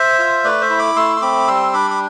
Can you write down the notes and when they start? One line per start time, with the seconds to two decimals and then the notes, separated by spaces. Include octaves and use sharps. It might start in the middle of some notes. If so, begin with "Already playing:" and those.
Already playing: C5 E5
0.19 F4
0.44 A3 B4 D5
0.61 C5 E5
0.70 E4
0.79 B5 D6
0.96 A3 C6 E6
1.17 C6
1.21 C4 B5 D6
1.48 G3 C6 E6
1.73 D4 B5 D6
1.91 D6